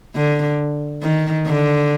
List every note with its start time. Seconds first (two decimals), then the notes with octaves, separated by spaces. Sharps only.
0.15 D3
1.03 D#3
1.46 D3